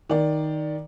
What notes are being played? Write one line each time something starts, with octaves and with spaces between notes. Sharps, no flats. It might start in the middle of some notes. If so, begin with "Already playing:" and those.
D#3 D5